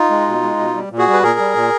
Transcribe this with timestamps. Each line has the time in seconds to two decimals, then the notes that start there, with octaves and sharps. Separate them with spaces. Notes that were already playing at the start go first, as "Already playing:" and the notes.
Already playing: D#4 F4
0.10 G#3
0.27 B2
0.42 G#3
0.59 B2
0.74 G3
0.91 A#2
0.98 F#4 G#4
1.07 G3
1.13 B4
1.23 A#2 G#4 A#4
1.39 G3
1.55 A#2